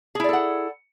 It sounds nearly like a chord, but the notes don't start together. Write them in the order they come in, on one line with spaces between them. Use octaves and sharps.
G#4 E4 D5 A4 F#5